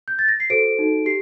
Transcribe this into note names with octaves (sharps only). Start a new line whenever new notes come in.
G6
A6
A#6
C7
F#4 A4 C5 D7
D#4 F#4 A4
G4 C7